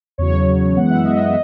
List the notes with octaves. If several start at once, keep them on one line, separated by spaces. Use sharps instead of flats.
E2 C#3 F#3 C#5
E2 C#3 F#3
F#2 E3 G#3 B3 F#5
E5
F#2 E3 G#3 B3 D#5
E5
D#5